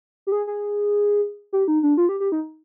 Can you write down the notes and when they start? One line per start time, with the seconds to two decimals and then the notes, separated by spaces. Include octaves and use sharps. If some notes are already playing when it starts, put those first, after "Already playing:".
0.27 G4
0.32 G#4
0.47 G#4
1.53 G4
1.68 D#4
1.83 D4
1.97 F4
2.09 G4
2.20 G4
2.32 D#4